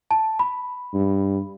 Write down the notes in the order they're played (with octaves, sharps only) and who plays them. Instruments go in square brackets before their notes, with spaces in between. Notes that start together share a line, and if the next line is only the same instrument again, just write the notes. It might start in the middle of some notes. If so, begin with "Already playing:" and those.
[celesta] A5
B5
[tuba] G2